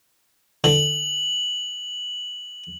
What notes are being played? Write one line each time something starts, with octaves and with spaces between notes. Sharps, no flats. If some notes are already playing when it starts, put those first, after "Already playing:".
D3 E3 F#7